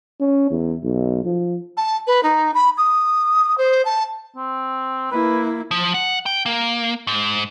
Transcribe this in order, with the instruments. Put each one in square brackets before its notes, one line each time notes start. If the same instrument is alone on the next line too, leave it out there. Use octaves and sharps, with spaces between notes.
[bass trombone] C#4
E2
B1
F3
[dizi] A5
B4
D#4
B5
D#6
C5
A5
[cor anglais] C4
[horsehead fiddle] A#3 E4 [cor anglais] B4
[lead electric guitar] F3
F#5
G5
A#3
G#2